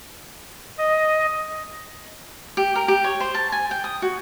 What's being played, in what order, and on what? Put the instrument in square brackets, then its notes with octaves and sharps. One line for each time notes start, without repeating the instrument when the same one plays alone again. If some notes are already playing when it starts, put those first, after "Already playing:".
[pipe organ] D#5
[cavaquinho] G4
A#4
G4
C#5
C5
A5
G#5
G5
D#6
F#4